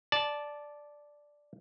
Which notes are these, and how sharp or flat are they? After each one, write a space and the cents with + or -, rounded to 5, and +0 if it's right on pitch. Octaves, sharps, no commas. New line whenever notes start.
D5 +0 A5 -10